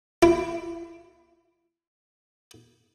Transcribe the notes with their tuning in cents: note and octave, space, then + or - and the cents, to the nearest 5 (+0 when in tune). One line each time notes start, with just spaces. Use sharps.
E4 +35